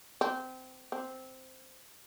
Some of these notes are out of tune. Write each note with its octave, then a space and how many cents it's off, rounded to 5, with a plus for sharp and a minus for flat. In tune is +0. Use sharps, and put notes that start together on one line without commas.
C4 -20
C4 -5